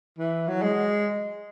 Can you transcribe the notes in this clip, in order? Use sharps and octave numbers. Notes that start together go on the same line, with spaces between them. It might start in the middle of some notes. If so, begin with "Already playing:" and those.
E3
F#3
G#3